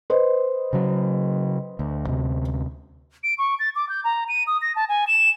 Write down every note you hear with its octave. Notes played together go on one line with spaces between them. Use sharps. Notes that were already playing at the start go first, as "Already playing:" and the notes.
B4 C5 D#5
C#3 F#3
D2
D2 C3
D7
C#6
A6
D6
G6
A#5
D#7
D#6
A#6
A5
G#5
E7